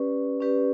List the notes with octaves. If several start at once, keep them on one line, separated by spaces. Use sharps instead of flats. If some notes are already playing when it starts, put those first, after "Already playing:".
Already playing: C#4 G4 B4 D5
C#4 G4 B4 D5